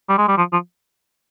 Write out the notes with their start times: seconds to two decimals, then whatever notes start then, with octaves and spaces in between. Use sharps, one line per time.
0.09 G3
0.18 G#3
0.28 G3
0.38 F3
0.52 F3